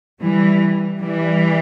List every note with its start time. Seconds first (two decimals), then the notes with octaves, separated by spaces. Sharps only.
0.20 E3 G3
1.00 E3 G3